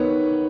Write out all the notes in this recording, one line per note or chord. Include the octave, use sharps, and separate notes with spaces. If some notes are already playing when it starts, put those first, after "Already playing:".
Already playing: D#3 B3 B4 C#5